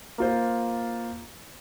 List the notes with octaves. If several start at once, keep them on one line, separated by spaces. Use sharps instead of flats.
A#3 F4 C5